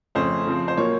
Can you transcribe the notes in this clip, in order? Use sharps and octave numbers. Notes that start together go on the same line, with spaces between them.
F2 C#3 A3 C#4 C5
C#3 F3 C4
C5
A#2 F#3 A#3 C#5